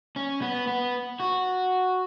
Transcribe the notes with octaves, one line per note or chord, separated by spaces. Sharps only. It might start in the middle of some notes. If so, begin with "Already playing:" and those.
C#4
B3
B3
F#4